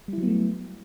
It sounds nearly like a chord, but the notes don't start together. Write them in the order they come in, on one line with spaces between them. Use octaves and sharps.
G3 E4 F#3 B3 A3